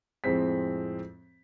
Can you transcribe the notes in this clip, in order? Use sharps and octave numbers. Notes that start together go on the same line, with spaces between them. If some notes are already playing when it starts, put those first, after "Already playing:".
F2 A2 G#3 C4 B6